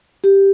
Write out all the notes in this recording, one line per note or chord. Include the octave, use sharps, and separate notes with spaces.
G4